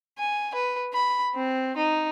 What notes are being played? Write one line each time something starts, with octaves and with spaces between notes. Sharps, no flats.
G#5
B4
B5
C4
D#4